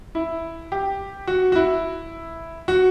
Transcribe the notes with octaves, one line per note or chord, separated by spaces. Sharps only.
E4
G4
F#4
F#4
E4
F#4